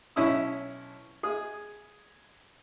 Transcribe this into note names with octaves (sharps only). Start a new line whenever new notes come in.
B1 C#4 E4 D#6 E6
G#4 D#6